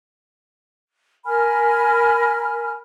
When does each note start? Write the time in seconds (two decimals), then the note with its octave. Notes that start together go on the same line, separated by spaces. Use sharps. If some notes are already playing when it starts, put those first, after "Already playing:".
1.26 A#4 G#5 B5 F6